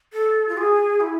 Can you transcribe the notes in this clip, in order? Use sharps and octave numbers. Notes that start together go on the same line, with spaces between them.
A4
F4
G#4
E4